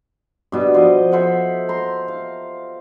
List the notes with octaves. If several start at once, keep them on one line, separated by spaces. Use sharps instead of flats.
G2 B2 D4
F3 D#5
A4 C5 E5 F#5
A#5 C6
F5